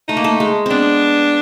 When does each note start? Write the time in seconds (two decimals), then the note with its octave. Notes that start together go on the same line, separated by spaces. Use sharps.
0.08 A3 D#4
0.17 A#3
0.24 A3
0.40 G#3
0.66 B3 C4 D4